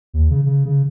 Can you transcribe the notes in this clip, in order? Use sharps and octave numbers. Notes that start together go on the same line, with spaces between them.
D#2
C#3
C#3
C#3